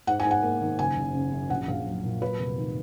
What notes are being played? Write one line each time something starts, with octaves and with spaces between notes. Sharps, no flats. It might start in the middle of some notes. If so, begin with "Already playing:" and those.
G#2 F#5
G#5
G#2
F#5
A#3
D#3
F#1 G#5
F#1
C#3
F#2
A#1 F#5
A#1 F5
F#3
A#2
F#3 B4
F1
D#3